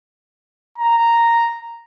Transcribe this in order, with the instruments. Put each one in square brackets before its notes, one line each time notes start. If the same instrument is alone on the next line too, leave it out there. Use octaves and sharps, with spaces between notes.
[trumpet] A#5